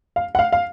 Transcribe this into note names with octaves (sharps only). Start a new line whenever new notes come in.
F5
F#5
F5
F5